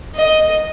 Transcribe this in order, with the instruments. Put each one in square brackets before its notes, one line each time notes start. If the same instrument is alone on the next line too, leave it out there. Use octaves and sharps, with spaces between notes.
[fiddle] D#5